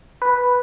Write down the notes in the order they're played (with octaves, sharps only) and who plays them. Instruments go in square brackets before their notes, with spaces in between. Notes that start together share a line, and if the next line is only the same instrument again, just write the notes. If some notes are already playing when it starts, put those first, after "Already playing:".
[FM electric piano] B4